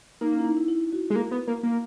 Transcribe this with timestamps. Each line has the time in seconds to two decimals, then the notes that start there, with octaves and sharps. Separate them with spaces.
0.21 A#3 D#4
0.33 C#4
0.39 E4
0.45 D#4
0.57 E4
0.68 E4
0.93 F#4
1.10 G#3
1.16 A#3
1.31 B3
1.48 A#3
1.63 A#3